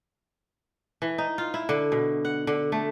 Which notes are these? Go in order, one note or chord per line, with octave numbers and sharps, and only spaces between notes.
E3
D#4
F4
E4
D3
B2
F#5
D3
A3